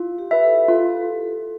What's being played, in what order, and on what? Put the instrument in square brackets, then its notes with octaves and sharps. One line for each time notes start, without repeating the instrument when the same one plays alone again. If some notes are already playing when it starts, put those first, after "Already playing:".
Already playing: [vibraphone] E4 [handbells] F4
[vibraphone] G4
[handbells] B4 E5
[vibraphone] A4
[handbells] F4 [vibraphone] A4